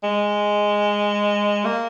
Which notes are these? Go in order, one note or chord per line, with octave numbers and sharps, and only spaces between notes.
G#3
A#3